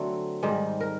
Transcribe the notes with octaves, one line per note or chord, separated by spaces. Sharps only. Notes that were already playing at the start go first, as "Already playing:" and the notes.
Already playing: D3 F#3 A3 C4 A4
G#2 D#3 G3
A#4